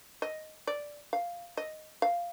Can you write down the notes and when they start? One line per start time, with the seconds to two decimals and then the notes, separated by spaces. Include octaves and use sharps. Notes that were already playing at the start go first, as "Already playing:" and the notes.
0.22 D#5
0.67 D5
1.13 F5
1.57 D#5
2.02 F5